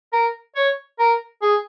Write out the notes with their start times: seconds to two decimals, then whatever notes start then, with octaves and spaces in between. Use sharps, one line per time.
0.13 A#4
0.56 C#5
0.99 A#4
1.42 G#4